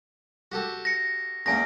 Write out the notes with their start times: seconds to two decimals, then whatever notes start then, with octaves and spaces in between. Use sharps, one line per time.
0.52 F#4 G4 A4
0.85 A#6 C#7
1.46 E2 A#2 C#4 G#5 A#6